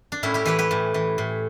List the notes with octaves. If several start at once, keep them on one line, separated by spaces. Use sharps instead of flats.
D4
A2 C#4 E4
E4 G4
E3 G4 B4
G4 B4
A2
E3
A2